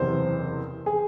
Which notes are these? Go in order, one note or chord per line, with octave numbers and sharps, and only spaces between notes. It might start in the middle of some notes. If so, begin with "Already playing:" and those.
Already playing: F#1 E2 C3 C5
G#4